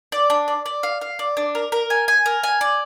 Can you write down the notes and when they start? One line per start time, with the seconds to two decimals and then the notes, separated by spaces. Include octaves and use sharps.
0.12 D5
0.30 D4
0.48 D5
0.66 D5
0.83 F5
1.01 F5
1.19 D5
1.37 D4
1.55 A#4
1.72 A#4
1.90 G#5
2.08 G#5
2.26 A#4
2.43 G#5
2.61 D5